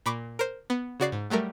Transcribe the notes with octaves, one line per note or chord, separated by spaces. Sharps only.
A#2 B5 C#6 D6
A#4 C5
B3
C#3 F#4 D5 C7
G#2
F#3 G3 A3 A#4